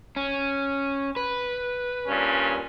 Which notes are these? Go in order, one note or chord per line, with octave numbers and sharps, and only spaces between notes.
C#4
B4
G2 A#2 C#4